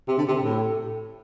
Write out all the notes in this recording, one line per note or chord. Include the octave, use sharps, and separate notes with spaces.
C3
D3
C3
A2